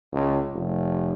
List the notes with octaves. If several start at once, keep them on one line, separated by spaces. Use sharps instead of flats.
C#2
F1